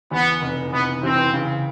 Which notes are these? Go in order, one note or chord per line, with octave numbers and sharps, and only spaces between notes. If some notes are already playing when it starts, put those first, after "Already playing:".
E2 B3
F1
F1 B3
E3 C4
C#3